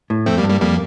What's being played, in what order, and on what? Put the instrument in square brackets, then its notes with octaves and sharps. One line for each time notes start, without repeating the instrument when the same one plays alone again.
[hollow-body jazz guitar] A2
[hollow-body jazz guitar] F2 [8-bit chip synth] A3 C4
[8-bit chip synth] G3 A#3
[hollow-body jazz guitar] G2
[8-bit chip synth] G3 A#3
[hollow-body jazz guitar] F2 [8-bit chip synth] G3 A#3